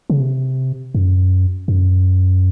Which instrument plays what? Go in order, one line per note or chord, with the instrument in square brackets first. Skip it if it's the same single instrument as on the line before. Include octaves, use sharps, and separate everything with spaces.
[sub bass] C#3
C3
F#2
F#2